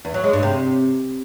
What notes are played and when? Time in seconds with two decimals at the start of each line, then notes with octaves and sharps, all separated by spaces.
0.05 E2
0.14 F#3
0.24 G#3
0.33 G2
0.43 C3